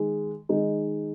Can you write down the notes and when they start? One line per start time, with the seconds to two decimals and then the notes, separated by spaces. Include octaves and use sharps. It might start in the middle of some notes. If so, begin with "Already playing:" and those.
Already playing: D#3 G#3
0.49 D#3 G#3 D#4